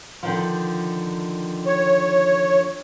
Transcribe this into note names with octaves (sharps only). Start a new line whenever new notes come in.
D3 D#3 F3
C#5